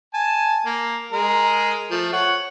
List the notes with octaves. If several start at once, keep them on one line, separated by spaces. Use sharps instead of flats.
G#5 A5
A#3
G#3 A#4
F3 A3
C#5 F#5